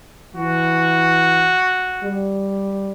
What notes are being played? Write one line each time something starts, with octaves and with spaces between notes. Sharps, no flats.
E3 F#4
G3